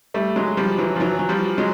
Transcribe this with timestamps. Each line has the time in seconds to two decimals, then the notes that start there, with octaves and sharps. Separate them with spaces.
0.14 G3 A3
0.36 F#3 G#3
0.57 F3 G3
0.78 E3 F#3
0.96 F3
1.00 E3 F#3
1.19 F#3
1.29 F3 G3
1.58 F#3 G#3